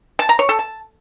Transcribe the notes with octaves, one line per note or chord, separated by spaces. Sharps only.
A5
A#5
C#5
A4
A5